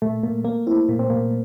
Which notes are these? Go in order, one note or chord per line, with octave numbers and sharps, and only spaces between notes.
A#2 A3
A#2 A#3
A3 A#3
C4 E4
A#2 A#3
C4
A#2 A#3